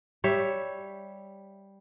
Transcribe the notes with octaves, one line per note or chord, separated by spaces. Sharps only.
G3 C#5 E5